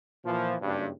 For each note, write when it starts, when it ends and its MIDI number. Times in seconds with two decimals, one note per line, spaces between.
0.24 0.55 46
0.24 0.55 52
0.24 0.55 53
0.61 0.88 30
0.61 0.88 43